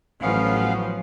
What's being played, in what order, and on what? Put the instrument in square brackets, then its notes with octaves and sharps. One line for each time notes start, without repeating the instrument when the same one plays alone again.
[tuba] A1 [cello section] F3 F#3 [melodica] B3 C#4 F5